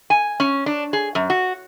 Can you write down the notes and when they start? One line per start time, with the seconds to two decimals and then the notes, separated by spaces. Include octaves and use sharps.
0.10 G#5
0.40 C#4
0.66 D4
0.93 G#4
1.15 F#2
1.30 F#4